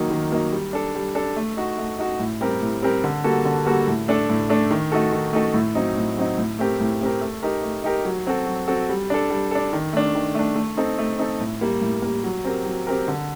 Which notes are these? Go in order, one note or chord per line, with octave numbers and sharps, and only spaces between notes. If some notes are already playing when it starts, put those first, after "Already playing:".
Already playing: D#3 F#3 A#3 D#4
D#3
F#3 A#3 D#4
G3
D4 A4
G3
D4 A4
A3
D#4 F#4
A3
D#4 F#4
A2
G3 C4 G4 A#4
A2
G3 C4 G4 A#4
D3
G3 A#3 F#4 A4
D3
G3 A#3 F#4 A4
A2
A3 D4 A4
A2
A3 D4 A4
D#3
A3 D#4 F#4 A4
D#3
A3 D#4 F#4 A4
A2
F#3 C4 D#4
A2
F#3 C4 D#4
A2
A3 C4 G4 A#4
A2
A3 C4 G4 A#4
A3
D#4 G4 A#4
A3
D#4 G4 A#4
F#3
C4 F#4 A4
F#3
C4 F#4 A4
G3
D4 A4
G3
D4 A4
D#3
A3 D4
D#3
A3 D4
A3
C4 D#4 A4
A3
C4 D#4 A4
A2
G3 A#3
A2
G3 A#3
F#3
C4 G4 A#4
F#3
C4 G4 A#4
D3